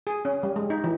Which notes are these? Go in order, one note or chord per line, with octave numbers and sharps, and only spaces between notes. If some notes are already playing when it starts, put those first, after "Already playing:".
G#4
C#4
G3
G#3
D#4
E3